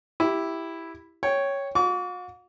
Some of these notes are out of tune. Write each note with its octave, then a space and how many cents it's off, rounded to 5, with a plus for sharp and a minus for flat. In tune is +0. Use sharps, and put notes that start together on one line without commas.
E4 +0 G4 +0
C#5 +0 G5 +0
F#4 -45 D6 -45